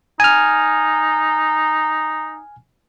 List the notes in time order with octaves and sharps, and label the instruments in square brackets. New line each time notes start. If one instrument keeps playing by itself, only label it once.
[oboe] D#4 [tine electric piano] G#5 F6